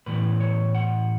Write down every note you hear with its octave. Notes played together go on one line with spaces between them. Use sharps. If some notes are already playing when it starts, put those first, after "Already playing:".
A2 E3 B3 B4
C#5
F#5